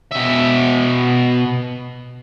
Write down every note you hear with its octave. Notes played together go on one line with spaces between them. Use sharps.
B2 E5